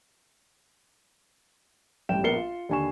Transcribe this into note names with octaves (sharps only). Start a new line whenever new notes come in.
A1 G2 G5 E7
A#1 B3 A#4 C7 C#7 G7
F4
D#2 D3 G#5 C#6 E7